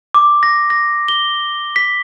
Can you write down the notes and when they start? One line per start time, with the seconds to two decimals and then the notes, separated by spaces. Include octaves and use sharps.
0.14 D6
0.43 A#6
0.70 A#6
1.08 G7
1.76 B6